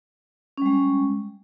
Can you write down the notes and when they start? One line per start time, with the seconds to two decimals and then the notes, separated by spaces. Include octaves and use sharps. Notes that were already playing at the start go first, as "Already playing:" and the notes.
0.58 C#4
0.62 G3
0.66 G#3